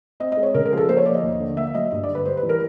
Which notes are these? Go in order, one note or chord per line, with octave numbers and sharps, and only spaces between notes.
C4 D#5
G#3 D#5
C#5
C#3 A#4
A#4
F3 G#4
A4
A#3 C5
C#5
F3 D5
D#5
D#2
D3
A#3 E5
F#3 D#5
G2
D5
D3
B4
G3 C5
B4
E3
A#4